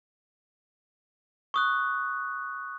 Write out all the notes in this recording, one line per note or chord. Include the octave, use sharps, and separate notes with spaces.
C#6 D#6 F#6